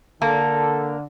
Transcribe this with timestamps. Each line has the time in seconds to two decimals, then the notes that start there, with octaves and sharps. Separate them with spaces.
0.22 D3 A#3 A4